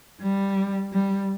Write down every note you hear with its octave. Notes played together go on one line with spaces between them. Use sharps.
G3
G3